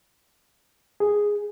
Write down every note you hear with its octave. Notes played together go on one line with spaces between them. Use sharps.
G#4